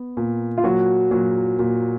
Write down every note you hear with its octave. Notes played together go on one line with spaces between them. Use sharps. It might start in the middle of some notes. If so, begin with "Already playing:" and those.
Already playing: B3
A#2
F4
A#2 F#3 F#4
A#2 F#3 F#4
A#2